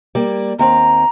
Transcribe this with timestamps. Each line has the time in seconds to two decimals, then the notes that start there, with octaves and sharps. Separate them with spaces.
0.15 G3 A#3 D5
0.59 D#2 C4 A#5